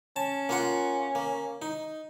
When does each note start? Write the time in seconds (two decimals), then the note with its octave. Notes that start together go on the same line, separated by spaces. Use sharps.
0.16 C#4 A5
0.49 A#3 F4 F#5
1.15 A#3
1.62 D#4